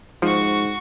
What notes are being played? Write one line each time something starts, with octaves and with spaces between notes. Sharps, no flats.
G#2 F3 F#4 C#6